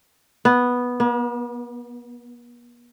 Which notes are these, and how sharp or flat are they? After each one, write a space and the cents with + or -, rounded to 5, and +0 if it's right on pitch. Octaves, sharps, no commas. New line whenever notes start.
B3 -5
B3 -45